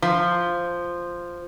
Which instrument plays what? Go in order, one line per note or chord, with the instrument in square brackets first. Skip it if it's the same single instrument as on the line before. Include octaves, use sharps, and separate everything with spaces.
[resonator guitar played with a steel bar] F3